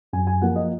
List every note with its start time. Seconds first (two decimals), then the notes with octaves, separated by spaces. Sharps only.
0.13 F#2 G#5
0.27 G#5
0.42 F3 A#3 F#5
0.56 D#5